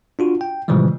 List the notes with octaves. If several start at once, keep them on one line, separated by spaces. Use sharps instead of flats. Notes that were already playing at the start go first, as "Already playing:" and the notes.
D4 F4 F#4
G5
A#2 C#3 E3 F3 G3 G#3